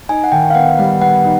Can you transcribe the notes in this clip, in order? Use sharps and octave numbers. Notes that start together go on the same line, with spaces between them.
D#4 G#5
F#5
D#3 G5
F5
B3 F#5
G3 F#5
B3 F#5
D#4